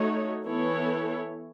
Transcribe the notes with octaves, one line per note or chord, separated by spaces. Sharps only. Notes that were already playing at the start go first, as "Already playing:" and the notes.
Already playing: A3 D#4 F#4 C#5
E3 B3 E4 A4 C#5